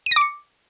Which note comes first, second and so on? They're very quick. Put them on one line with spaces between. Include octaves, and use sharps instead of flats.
D#7 A#6 D6 C#7